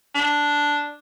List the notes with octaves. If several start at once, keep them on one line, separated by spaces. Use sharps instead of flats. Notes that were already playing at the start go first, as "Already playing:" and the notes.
D4